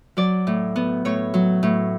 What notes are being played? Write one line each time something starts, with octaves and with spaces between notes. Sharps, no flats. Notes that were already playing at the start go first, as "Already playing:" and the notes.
F#3 D5
A2
B3
A2 C#5
F#3
A2